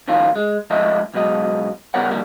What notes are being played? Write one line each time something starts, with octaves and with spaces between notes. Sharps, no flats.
F2 A2 D#3 C#4 F4
G#3
G#2 F3 A3 D#5 E5
C#2 B2 F#3 G#3 D#5
C#3 G3 B3 A#4 C#5 F#5
D3 F3 G3 A#3